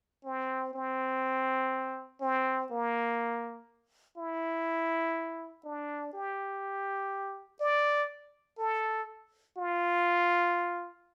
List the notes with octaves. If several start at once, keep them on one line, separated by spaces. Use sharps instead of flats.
C4
C4
C4
A#3
E4
D4
G4
D5
A4
F4